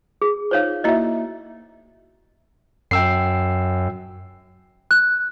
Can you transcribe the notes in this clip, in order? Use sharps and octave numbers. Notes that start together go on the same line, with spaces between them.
G#4
D#4 F4 C5 C#5 F5
A#3 E4 F#4 D#5 E5
F#2 G5 E6 C7
F#6